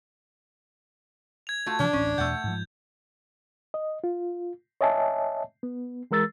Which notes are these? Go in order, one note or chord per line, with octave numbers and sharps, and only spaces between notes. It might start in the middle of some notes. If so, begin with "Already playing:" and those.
G#6 F7
A3 F4 F#4
C3 E3 F3 D4
D1 A1 C#4
E2 B2 A3 F#5 G6
G#2 F3
D#5
F4
C#5 D#5 E5 G#5 A5
B3
E3 G#3 A#4 E6 A6